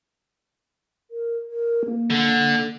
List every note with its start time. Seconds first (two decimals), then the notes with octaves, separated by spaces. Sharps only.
1.11 A#4
1.50 A#4
1.86 A#3
2.11 D3